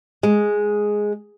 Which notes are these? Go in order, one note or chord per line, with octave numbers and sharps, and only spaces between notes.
G#3